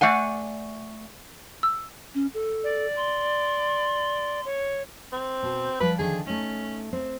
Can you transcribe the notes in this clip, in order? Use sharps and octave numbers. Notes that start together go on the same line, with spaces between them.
A3 D5 F#5 G#5
E6
C#4
A4
D5
C6
C#5
C4
B2
F3 G3 B4 D5
D3 D#3 F3 G#4
A3 C#4 D#4
C4